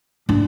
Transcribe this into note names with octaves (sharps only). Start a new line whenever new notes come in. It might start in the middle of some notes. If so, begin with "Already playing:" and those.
D4